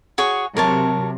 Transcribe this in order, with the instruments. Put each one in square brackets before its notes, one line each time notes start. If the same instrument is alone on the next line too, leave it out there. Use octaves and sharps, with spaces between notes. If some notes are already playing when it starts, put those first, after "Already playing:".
[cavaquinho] F#4 G#4 C#5
[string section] C3 F#3 [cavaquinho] A#4 C#5 A5